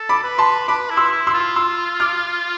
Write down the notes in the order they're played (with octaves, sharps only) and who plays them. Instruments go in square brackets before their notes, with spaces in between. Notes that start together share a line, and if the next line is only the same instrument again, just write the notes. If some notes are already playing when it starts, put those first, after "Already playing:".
Already playing: [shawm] A4
[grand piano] B5 D6
[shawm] B4
[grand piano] A5 C6
[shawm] B4 [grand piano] B5 D6
[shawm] E4
[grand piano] C6 E6
[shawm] E4
[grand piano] C6 E6
[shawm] F4
[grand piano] C6 E6
D6 F6